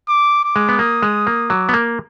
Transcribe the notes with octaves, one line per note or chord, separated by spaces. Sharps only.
D6
D6
G#3
B3
A#3 D#6
G#3
A#3
F#3 D6
B3
A#3